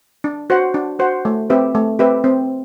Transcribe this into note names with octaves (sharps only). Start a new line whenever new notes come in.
D4
F#4 C5 F#5
D4
F#4 C5 F#5
A3
C4 G4 B4 E5
A3
C4 G4 B4 E5
C4